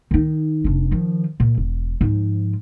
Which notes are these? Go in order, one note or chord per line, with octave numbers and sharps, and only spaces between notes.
D#3 D#4
F1 D4
D#3 F3
A#2
E1
G#2 F3